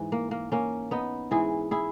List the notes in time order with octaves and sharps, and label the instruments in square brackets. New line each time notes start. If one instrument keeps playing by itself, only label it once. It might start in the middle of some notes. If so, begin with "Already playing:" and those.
Already playing: [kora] G#2 E3
A#3
A#3
A#3 C#4
B3 D#4
G#2 E3 E4 G#4
E4 G#4